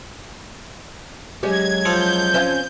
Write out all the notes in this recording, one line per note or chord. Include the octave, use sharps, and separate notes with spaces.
F#3 G#3 C#4 G4 G#6
F3 A4 G6
C4 C#4 F5